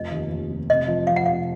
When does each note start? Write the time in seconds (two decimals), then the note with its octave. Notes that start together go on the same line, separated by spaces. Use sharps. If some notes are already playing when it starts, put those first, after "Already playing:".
Already playing: F1 D#5
0.11 D#2
0.31 D#2
0.50 F1
0.70 C3 D#5
0.88 F3
1.07 F2 F5
1.16 F#5
1.26 C3 F5